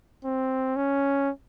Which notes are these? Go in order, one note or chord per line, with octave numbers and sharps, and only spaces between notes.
C4
C#4